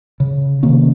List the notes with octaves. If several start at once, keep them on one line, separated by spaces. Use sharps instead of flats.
C#3
C3 D#3 A#3 C#4